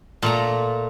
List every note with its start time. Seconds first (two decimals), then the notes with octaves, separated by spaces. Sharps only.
0.22 A#2 A3 A#5